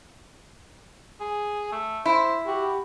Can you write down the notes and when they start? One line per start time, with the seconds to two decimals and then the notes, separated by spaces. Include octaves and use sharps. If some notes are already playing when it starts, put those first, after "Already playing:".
1.20 G#4
1.72 A3
2.06 E4 C5
2.47 F#4 G4